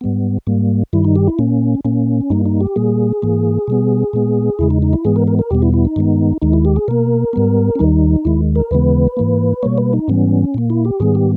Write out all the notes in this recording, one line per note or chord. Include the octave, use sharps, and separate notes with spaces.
G#2 G3 B3
G#2 G3 A#3
G2 D#3 G3 E4
D#4
G4
E4
A#2 A#3 C#4
A#2 A#3 C#4
G2 G3 A#3 D#4
D#4
G4
A#2 G3 A#3 G#4
G#2 E3 A#3
B2 G3 B3
A#2 G#3 B3
E2 C#3 G#3 E4
D#4
D#4
E4
G#2 E3 G#3 B3 G#4
A#4
A#4
A#4
E2 B2 G3 B3 G4
E4
E4
D#4
G2 D#3 G#3 B3
D#2 D#3 G#3 D#4
E4
G4
G#4
B2 A#3 A#4
G#2 G3 B3
C#4
D#2 D#3 G3 D#4
D#2 D#3 G#3 E4
A#4
D#2 C#3 E3 G#3 B3 B4
G#2 E3 A#3
B2 G3 A#3 C#5
B4
D#4
G#2 E3 G3 B3 C#4
A#2 A#3
E4
G4
G#2 D#3 G3 B3 G#4
G4